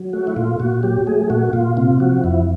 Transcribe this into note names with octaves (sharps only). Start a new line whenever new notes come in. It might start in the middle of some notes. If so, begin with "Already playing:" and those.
Already playing: F#3
A3 F#4
E4
A#2 F4
A#2 F#4
F#3 G4
A3 G#4
A#2 F#4
A#2 F4
C3 F4
F3 F#4
F2 E4